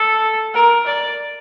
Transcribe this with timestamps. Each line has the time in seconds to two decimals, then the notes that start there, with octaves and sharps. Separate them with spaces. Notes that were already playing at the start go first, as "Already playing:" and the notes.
Already playing: A4
0.54 A#4
0.86 D5